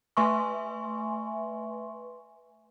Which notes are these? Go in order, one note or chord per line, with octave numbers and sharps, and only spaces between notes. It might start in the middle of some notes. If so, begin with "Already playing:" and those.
A3 B4 E5 G#5 C6 C#6